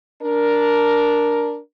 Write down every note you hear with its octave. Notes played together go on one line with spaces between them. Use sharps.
D4 A#4